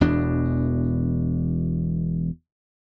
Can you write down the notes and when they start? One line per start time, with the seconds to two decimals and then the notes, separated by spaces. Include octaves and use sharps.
0.01 E1 E2 B2 D4